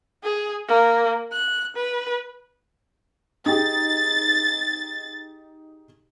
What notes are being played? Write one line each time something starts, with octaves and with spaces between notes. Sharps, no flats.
G#4
A#3
F#6
B4
D#4 G4 G#4 A6